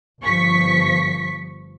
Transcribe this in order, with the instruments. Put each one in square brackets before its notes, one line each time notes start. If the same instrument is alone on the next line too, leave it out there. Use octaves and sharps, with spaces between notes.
[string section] G1 F3 C#6 B6